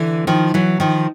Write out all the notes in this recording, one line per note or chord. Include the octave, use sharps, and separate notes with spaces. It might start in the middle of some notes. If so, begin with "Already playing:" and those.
Already playing: D3 E3
D#3 F3
E3 F#3
D#3 F3